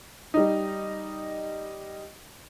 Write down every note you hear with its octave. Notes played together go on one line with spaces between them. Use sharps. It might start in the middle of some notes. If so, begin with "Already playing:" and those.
G3 D#4